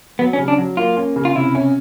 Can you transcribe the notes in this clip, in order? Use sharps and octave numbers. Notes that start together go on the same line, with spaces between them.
F#3 B3
C#4
C#3
D4
F#3
A#3 F4
C#4
C#3
F4
C3 E4
C#4